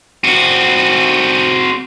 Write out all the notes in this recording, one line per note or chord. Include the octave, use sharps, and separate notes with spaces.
C4 F#4